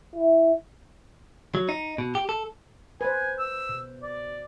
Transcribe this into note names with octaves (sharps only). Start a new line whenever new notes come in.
E4
F#3
D#4
B2
G4
A4
B4 C5 G#5
E6
B2
D5